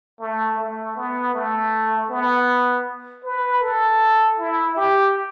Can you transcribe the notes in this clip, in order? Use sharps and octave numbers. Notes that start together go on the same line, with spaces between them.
A3
A3
B3
A3
B3
B4
A4
E4
G4